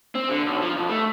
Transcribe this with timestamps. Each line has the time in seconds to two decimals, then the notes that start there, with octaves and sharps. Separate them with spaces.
0.15 C4
0.29 D3
0.46 B1
0.62 F3
0.76 F2
0.89 A3